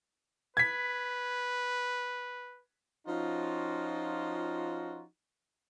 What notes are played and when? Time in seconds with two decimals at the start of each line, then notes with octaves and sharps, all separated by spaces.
0.57 B4 G#6 B6
3.07 F3 C#4 D#4 F4 F#4